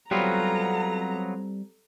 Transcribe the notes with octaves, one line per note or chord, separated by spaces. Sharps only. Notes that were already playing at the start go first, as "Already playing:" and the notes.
F#3 G3 B3 C4 F4 A4 A#5